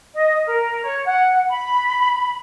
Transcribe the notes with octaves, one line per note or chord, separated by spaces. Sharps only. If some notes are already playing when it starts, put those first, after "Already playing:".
D#5
A#4
C#5
F#5
B5